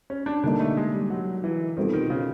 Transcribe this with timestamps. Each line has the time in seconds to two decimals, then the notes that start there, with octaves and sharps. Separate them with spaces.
0.10 C#4
0.26 D4
0.44 D3 G3 A#3 D4 D#4
0.60 A3
0.77 G#3
0.94 G3
1.10 F#3
1.44 E3
1.77 B2 D#3 G3 C4 F4 A4
1.93 D#3
2.10 C#3